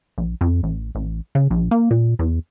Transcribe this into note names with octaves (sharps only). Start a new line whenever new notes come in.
A#1
F2
A1
A1
C#3
A#1
A#3
A#2
E2